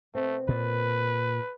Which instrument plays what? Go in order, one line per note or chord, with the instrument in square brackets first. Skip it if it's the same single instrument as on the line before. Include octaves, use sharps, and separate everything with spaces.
[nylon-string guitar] B2 C4 [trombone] A3
[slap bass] A#2 [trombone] B4